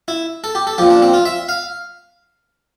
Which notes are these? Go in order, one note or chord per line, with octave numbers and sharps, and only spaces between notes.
E4
A4
G4
A4
A#2 F3 G4
D4
C4
F4
E5
F5